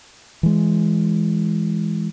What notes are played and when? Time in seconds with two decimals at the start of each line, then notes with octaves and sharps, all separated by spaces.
0.43 E3 G#3